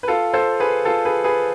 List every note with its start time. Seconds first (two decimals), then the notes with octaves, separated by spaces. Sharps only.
0.03 B4
0.08 F4 A4
0.34 A4 C5
0.60 G#4 B4
0.85 F4 A4
1.05 G#4 B4
1.24 G#4 B4